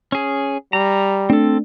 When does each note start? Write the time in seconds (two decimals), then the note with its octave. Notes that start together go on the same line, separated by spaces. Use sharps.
0.12 C#4 G#4
0.73 G3 A#5
1.30 A3 C4 D4 A4